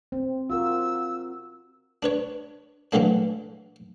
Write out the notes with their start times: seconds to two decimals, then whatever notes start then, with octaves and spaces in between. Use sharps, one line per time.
0.12 C4
0.50 F4 F#4 A#4 E6
2.03 D4 B4 C#5
2.92 E3 F#3 A3 A#3 D4